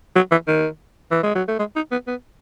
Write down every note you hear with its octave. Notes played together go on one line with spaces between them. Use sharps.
F#3
E3
D#3
E3
G#3
F#3
A3
G#3
D#4
B3
B3